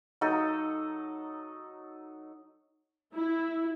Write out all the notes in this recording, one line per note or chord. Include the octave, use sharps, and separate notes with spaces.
F#3 D#4 A4 D#5
E4